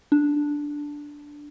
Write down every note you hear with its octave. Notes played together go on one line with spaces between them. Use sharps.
D4